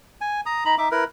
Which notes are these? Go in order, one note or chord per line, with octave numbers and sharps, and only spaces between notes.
G#5
A#5 D#6
D#4 A#5 B5
D#4 E5 D6
E4 A#4 B4